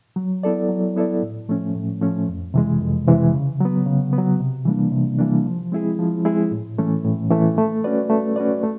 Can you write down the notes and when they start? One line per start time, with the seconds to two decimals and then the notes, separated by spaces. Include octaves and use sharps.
0.16 F#3
0.43 B3 E4 A4 D5
0.69 F#3
0.96 B3 E4 A4 D5
1.23 A2
1.49 F3 A3 C#4
1.75 A2
2.01 F3 A3 C#4
2.28 F2
2.54 C3 E3 G#3
2.81 F2
3.07 C3 E3 G#3
3.34 C#3
3.60 F#3 B3
3.86 C#3
4.13 B3
4.18 F#3
4.40 C3
4.66 E3 G3 A#3 D4
4.92 C3
5.19 E3 G3 A#3 D4
5.46 F3
5.72 G#3 C4 E4 G#4
5.99 F3
6.25 G#3 C4 E4 G#4
6.51 A2
6.78 E3 A3 C#4
7.04 A2
7.30 E3 A3 C#4
7.58 A3
7.84 C#4 F#4 B4 D5
8.10 A3
8.36 C#4 F#4 B4 D5
8.63 A3